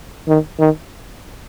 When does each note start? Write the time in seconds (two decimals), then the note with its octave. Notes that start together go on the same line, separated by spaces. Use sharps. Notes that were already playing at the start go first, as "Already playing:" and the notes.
0.28 D#3
0.59 D#3